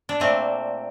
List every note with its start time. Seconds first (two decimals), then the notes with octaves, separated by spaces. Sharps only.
0.09 D4
0.20 A#2 A3 C4